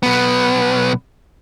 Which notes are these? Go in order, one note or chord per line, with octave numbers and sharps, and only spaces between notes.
B1 B3